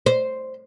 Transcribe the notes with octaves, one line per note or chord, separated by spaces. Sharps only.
C5